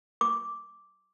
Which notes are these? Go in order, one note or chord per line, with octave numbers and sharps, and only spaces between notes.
D6